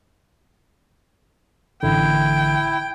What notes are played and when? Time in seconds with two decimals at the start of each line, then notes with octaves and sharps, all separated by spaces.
1.83 A1 D3 E4 G5